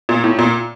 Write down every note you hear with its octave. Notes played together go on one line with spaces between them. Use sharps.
A#2
A2
A#2